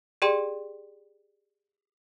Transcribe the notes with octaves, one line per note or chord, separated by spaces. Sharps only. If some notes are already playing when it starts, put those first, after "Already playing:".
G4 G#4 D5 G5 C6 D#7